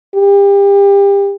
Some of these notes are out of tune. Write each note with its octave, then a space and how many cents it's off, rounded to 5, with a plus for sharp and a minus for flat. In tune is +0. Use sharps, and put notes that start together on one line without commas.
G4 +30